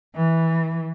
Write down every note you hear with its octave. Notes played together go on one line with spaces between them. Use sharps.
E3